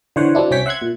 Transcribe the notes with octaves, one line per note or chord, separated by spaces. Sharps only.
D3 E3 C5 C#5 F#5
F#3 C4 D4 E4
C2 C4 C#4 C#5 G5 B6
E5 F#5 C6 F#6 G#6
A#2